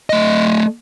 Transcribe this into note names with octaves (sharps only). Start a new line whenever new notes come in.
A3 D#5